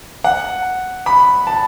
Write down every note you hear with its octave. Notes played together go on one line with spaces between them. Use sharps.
F#5
B5
A5